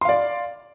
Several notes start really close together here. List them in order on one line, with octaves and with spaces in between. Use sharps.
C6 F5 D5